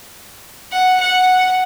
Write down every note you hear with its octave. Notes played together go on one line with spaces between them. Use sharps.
F#5
F#5